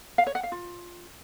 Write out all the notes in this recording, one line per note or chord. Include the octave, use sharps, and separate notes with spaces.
F5
C#5
F#5
F5
F4